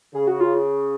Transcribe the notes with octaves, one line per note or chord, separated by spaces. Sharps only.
C#3 G#4
F#4
F4